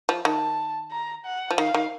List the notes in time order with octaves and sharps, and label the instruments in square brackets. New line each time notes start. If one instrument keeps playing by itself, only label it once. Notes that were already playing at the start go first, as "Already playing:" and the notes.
[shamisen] F3
[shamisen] D#3 [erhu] A5
[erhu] A#5
F#5
[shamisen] F3
[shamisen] D#3 [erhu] F5
[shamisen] D#3